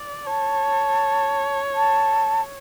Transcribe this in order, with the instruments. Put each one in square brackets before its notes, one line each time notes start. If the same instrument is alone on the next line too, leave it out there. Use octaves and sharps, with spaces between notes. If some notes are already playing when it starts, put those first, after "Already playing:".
Already playing: [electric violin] D5
[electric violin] C#5 [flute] A5
[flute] A5